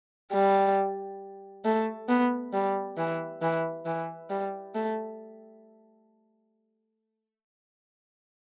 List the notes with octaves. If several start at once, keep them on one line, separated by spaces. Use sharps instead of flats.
G3
A3
B3
G3
E3
E3
E3
G3
A3